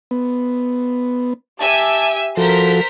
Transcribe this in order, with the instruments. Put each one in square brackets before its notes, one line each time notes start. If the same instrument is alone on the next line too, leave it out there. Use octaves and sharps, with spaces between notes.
[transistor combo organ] B3
[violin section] G4 E5 G#5 [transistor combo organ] A5
[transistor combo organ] F3 F#4 A4 [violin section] A#4 C5 B6